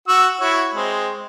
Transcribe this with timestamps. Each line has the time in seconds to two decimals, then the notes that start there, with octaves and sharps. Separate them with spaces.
0.08 F#4 F#5 E6
0.40 E4 F#4 C#5
0.74 G#3 C4